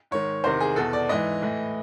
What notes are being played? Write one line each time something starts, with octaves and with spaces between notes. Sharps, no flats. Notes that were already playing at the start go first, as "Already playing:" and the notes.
G#2 D#3 C#5
E2 C3 D#3 C5
G#4
E2 B2 A4
D5
G#2 E3 D#5
A2 E3